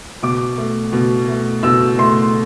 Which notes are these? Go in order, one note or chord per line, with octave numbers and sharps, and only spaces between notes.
B2 D6
A3
B2
A3
B2 E6
A3 C6